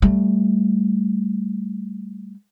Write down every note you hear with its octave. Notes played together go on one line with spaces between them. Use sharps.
G3 A3